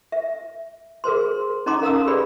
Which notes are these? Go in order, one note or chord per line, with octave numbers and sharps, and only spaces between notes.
E5
G#4 A#4 C5 C6
C#4 D#4 C#5 A#5 C6 D6
A#4 F5 A#5 D#6 E6
G4 G#4 B4 C#5 D5 B5